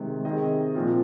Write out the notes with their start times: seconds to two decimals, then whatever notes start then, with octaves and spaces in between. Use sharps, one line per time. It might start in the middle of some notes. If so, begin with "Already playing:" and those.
Already playing: C3 D#3 G#3
0.25 C3 D#3 C4 G#4 D#5
0.75 A#2 F3 C4 F4